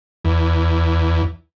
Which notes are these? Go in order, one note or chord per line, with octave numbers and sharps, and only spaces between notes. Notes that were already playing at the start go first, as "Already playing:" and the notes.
E2